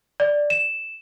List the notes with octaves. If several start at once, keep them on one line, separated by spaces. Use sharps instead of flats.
D5
E7